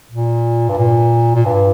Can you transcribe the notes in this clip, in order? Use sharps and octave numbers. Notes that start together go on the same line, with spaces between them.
A#2
G2
A#2
A#2
G2